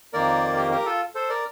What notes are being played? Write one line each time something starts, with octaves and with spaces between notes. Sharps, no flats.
F2 D#3 A#3 A#4 D5
G4 A#4
G4 A#4
F4 A4
A4 C5
A#4 D5